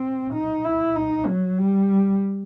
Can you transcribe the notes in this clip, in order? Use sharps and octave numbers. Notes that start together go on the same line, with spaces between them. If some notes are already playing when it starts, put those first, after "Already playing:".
Already playing: C4
D#4
E4
D#4
F#3
G3